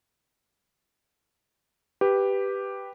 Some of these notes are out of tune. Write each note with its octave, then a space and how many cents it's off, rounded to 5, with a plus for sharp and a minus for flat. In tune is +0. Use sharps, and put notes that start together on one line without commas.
G4 +0 B4 +0